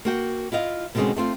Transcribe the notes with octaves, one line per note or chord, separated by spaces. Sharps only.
A#3 F#4 G5
E4 F4 D#5 F5
B2 D3 D#3 G#3 C4 C#4
A3 C4 F4